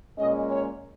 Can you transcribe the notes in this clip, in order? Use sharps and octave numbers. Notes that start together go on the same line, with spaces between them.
A#2 G#3 C#4 D#5
C#5